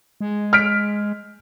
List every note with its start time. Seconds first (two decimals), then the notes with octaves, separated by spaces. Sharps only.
0.21 G#3
0.53 F6 B6 D7